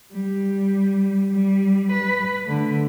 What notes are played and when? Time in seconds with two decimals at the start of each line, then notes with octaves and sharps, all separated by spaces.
0.12 G3
1.32 G3
1.92 B4
2.44 D3 A3